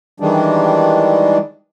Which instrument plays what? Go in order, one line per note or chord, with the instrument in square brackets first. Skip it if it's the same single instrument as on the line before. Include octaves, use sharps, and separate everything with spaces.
[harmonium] D#3 E3 G3 G#3 D4